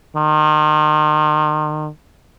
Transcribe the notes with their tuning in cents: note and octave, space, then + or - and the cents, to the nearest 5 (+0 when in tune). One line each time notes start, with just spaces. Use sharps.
D#3 -35